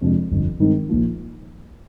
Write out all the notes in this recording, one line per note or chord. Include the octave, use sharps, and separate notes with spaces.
F2 C3 F3 G#3 D4
G1 F2 D3
G2 D#3 G#3 C4 D#4
A#1 A#2 F3